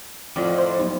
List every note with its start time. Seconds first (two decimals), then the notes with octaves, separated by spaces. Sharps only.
0.36 F2 A2 F4 D5 G5
0.58 C5
0.79 F#3 B3 D#4